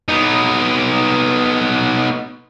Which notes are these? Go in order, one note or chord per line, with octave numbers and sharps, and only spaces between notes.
B3 D#4